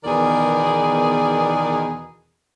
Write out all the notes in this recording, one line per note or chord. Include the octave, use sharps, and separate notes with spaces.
E2 B2 D#3 G#4 A#4 D5